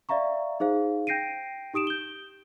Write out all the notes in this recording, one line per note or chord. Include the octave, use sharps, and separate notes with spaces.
D5 E5 F5 A#5 C#6
D#4 G#4 C5 F5
G5 G6 A#6 C7 D7 D#7
D#4 G4 D#6 D7 E7
G6 G7